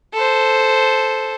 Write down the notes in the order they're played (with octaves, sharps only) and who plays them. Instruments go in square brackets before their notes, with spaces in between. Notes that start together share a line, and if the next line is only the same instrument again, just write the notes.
[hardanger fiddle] A4 C5